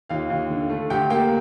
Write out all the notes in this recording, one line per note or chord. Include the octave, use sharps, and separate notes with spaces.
D#2 F4 F5
D#2
D3
A3
D2 G4 G5
A#3 G4 G5